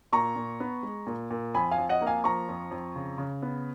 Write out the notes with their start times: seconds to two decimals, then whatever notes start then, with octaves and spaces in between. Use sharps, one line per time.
0.12 A#2 A#5 C#6
0.36 A#2
0.60 B3
0.83 G#3
1.07 A#2
1.31 A#2
1.54 F2 G#5 B5
1.71 F5 G#5
1.78 F2
1.89 D#5 F#5
2.02 A#3
2.07 F5 G#5
2.24 F3 A#5 C#6
2.49 F2
2.71 F2
2.96 C#3
3.18 C#3
3.42 B3